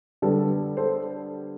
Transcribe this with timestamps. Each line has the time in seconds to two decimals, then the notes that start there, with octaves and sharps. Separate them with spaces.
0.22 D3 G3 B3 A4
0.77 A4 C5